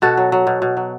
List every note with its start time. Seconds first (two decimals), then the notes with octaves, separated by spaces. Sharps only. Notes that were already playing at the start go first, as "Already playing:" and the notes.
0.02 B2 F#4 A4
0.17 F#3
0.32 F#3
0.47 B2
0.62 B2
0.77 F#3